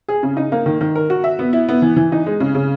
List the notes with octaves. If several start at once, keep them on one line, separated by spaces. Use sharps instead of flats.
G#4
C#3
D#4
A#3
D#3
D#3
A#4
F#4
E5
B3
E4
B3
E3
E3
D#4
G#3
C#3
C#3